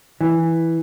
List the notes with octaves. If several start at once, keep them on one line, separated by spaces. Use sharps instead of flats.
E3